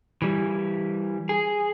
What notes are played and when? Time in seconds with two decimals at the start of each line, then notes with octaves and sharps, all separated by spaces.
0.22 E3 G3
1.29 G#4